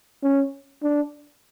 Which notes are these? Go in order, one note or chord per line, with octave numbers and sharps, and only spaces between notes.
C#4
D4